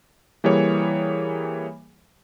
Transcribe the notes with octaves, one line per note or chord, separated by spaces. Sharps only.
E3 G3 A#3 G#4 C#5